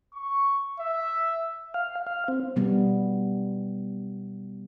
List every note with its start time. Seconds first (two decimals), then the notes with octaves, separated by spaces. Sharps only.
0.14 C#6
0.80 E5
1.74 F5
2.07 F5
2.28 C4
2.56 B2 G3 B3